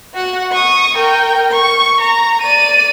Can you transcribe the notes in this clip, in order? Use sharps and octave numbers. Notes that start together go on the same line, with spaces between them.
F#4 F#5
C#6 D#6
A#4 G5
C#6
A#5
D5 D#7